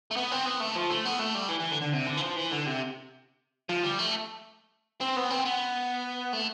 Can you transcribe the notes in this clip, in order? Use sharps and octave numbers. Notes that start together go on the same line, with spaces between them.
A3
B3
C4
B3
A3
F3
A3
B3
A3
G3
E3
E3
D3
D3
C3
D3
E3
F3
E3
D3
C3
F3
G3
A3
C4
B3
C4
B3
A3